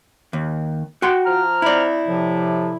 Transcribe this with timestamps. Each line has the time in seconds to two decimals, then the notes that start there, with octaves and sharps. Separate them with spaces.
0.33 D#2
1.02 F#4 G5 C6
1.25 F3 A#5 F6
1.62 E4 D5
2.08 A2 C3 F3